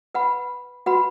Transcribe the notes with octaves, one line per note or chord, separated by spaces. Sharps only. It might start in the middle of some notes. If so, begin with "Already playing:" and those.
B4 F#5 B5
F#4 B4 F#5 B5